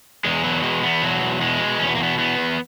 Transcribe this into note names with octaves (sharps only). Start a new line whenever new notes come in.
E2 G#3
B2 F#3
E2 G#3
E2 B3
B2 F#3
E2
B2 G#3
B2
E2 C#4
B3
A#3
B2 B3
E2 B3
E2